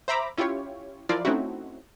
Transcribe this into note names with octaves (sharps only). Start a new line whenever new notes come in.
C5 E5 A#5 B5 D6
C#4 E4 F4 G4 C#5
F3 E4 F4 A#4 D5
A3 C4 C#4 D#4 E4 F#4